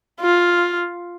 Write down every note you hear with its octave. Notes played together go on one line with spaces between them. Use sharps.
F4